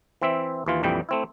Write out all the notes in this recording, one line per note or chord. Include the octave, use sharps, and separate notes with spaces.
E3 C4 E5
D#2 E3 F4
A#1 F2 E3 G3 G5
A3 C4 E4